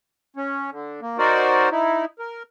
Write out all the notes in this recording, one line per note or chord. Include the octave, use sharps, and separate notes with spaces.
C#4
D3
A#3
D#4 F#4 A#4 C5 D5
D#4 E4
A#4